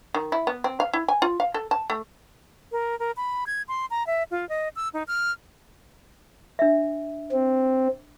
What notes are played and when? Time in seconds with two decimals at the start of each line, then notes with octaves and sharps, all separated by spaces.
0.14 D#3
0.32 E4
0.47 B3
0.64 C4
0.80 F5
0.93 E4
1.08 G#5
1.22 F4
1.40 F5
1.54 A4
1.71 A5
1.90 A3
2.72 A#4
2.99 A#4
3.17 B5
3.47 G#6
3.68 C6
3.91 A#5
4.07 E5
4.31 F4
4.49 D#5
4.76 E6
4.94 D#4
5.08 F6
6.59 D4 E5
7.31 C4